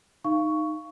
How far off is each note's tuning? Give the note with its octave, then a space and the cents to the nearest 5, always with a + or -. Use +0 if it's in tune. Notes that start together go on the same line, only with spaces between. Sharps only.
D#4 -5 F5 -20 C#6 +10